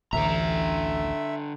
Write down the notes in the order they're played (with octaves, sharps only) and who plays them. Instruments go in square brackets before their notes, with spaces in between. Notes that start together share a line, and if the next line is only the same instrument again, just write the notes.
[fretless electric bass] A1 D2 [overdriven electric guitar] D3 A#5 [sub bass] E3 [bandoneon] E5